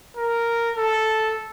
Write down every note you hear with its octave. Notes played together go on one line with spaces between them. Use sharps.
A#4
A4